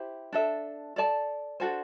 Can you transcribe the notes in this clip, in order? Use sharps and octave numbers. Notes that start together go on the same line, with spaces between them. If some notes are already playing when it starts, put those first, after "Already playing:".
Already playing: E4 G4 C5
D4 A4 E5
A4 D5 A5
D4 F#4 A4 C5